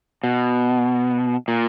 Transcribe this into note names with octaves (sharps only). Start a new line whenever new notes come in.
B2
A#2